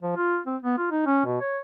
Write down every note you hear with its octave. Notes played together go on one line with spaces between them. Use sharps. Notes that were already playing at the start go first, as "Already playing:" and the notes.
F3
F4
C4
B3
F4
D#4
C#4
B2
C#5